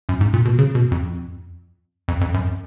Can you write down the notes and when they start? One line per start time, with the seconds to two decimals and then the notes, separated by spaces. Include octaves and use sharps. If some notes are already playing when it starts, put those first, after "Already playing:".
0.09 F#2
0.21 G#2
0.34 A#2
0.45 B2
0.59 C#3
0.75 B2
0.91 F2
2.08 F2
2.21 F2
2.34 F#2